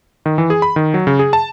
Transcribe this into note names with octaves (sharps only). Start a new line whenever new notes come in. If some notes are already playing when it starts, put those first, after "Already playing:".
D#3
E3
G#4
B5
D#3
F#3
C#3
G#4
A5